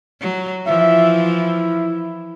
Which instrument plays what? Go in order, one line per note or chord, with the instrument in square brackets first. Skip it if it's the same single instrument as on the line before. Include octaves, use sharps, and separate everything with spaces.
[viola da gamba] F#3
[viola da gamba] E3 F3 [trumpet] E5
[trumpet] E4